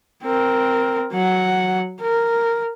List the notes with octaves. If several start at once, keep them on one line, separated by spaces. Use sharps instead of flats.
C4 A#4
F#3 F#5
A#4